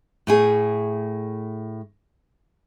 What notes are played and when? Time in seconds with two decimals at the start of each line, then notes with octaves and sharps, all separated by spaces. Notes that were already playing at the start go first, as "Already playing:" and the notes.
0.27 A2 A3 G#4